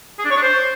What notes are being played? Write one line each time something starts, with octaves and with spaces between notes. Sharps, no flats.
G#4
D4
C#5
D4
C5